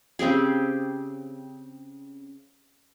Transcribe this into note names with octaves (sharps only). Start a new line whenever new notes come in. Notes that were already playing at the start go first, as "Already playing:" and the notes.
C#3 C4 G4 G#4